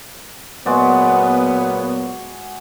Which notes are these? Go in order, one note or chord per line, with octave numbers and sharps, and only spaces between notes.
A#2 F#3 G#3 B3 F#4 D5